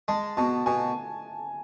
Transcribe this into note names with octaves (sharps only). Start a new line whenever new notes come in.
G#3 A5
B2 A5
B2 G#5